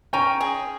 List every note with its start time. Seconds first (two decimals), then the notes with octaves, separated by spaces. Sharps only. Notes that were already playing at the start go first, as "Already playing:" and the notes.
0.13 C#4 G5 A#5
0.41 G#4